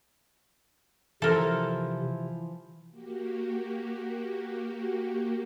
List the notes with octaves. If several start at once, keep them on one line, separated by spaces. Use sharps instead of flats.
C3 E3 F3 E4 A4 A#4 C5
A#3 F#4 G4